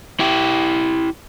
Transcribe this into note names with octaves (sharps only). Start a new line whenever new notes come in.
E4 G4